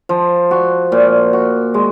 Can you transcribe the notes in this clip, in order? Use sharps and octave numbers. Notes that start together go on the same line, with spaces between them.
F3
F#4
A#2
F#4
G#3